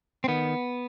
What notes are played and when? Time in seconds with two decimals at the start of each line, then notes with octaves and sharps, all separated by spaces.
0.24 C4
0.28 D#3 B3